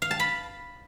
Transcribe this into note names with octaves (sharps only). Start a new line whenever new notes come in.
F5
A5
B5